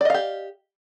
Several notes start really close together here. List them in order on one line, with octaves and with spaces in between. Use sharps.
D5 D#5 F5 G4